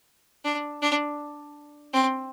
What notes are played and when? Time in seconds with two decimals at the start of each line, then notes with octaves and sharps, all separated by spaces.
0.45 D4
0.82 D4
1.93 C4